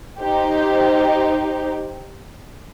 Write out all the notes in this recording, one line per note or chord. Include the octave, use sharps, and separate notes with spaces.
D#4 G4 C5